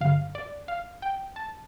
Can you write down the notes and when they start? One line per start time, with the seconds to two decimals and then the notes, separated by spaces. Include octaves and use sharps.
0.01 G2 D3 F5
0.35 D5
0.68 F5
1.02 G5
1.36 A5